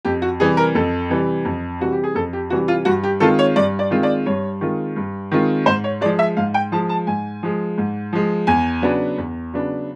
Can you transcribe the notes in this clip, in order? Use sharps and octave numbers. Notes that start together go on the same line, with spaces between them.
F2 G4
F#4
C3 E3 G3 G#4
A#4
F2 A4
C3 E3 G3
F2
C3 E3 G3 F#4
G4
G#4
F2 A4
G4
C3 E3 G3 F#4
F4
G2 F#4
G4
D#3 G#3 C4 F4 A4
C#5
G2 D5
D5
D#3 G#3 C4 F4
D5
G2 C#5
D#3 G#3 C4 F4
G2
D#3 G#3 C4 F4
G#2 C5
C#5
F3 G#3 D5
E5
G#2 F5
G5
F3 G#3 A5
A5
G#2 G#5
F3 G#3
G#2
F3 G#3
E2 G#5
C#3 F#3 B3 D4
E2
C#3 F#3 B3 D4